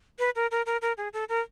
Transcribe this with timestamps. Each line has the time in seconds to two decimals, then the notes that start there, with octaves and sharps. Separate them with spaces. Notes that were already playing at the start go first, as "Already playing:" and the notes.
0.19 B4
0.36 A#4
0.51 A#4
0.66 A#4
0.82 A#4
0.97 G#4
1.13 A4
1.29 A#4